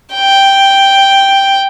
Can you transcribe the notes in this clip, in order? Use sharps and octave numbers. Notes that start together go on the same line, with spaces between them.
G5